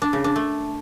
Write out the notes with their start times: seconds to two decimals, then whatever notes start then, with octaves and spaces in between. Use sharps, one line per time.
0.02 D4
0.13 C#3
0.24 D4
0.36 A3